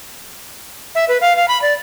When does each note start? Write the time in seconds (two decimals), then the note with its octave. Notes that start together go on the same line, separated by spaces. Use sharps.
0.95 E5
1.08 B4
1.21 F5
1.36 F5
1.48 B5
1.62 D5